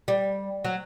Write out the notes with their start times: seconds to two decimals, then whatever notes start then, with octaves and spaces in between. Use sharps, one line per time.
0.08 G3
0.64 F#3